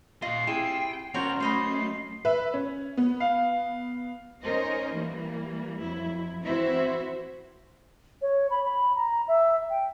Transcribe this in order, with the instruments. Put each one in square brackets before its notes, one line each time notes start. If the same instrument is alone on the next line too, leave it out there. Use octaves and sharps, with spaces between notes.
[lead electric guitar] A#2 D#5 [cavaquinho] F4 [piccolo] C7
[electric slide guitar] E4 G4 [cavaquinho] G#4 [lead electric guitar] G5
[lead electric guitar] C#2 C#5 [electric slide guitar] F#3 C#4 [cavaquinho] F#4 A#4 C5 [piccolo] F7
[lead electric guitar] A3 [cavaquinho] C5 D#5 B5 [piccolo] C7
[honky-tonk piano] B4 E5
C#4
B3
[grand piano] F5
[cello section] C#4 D#4 A#4 C5 D#5
E3 G3 A#3
F2 F#3 E4
E3 C4 E4 F#4 C5 E5
[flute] C#5
B5
B5
A#5
E5
G5